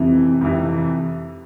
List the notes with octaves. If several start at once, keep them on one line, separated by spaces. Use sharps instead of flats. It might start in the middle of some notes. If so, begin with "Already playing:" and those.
Already playing: F2 C3 E3
F2 C3 E3